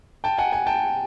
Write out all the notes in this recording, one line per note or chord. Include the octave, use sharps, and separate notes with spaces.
G5 A5
F#5 G#5
F#5 G#5
G5 A5